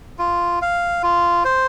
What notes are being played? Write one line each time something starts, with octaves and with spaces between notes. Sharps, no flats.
F4
F5
F4
C5